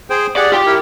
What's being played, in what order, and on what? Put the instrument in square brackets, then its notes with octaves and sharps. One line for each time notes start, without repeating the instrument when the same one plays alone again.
[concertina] G#4 C5 G5
[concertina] G4 G#4 F#5 [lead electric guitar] D5
[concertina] F4 [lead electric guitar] G4 G5
[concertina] E4 A#4